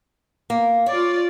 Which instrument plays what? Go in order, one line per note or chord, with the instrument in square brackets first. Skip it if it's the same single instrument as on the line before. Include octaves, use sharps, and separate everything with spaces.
[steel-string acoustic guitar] A#3
[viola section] F4 D5 [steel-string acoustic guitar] C#5